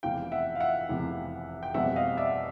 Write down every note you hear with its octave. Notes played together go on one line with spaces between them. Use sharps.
F1 E2 C3 E3 F5 G5
E5 F#5
F5
E5 F#5
F1 E2 C3 E3
G5
F1 E2 B2 G3 C4 E5 F#5
D#5 F5
D5 E5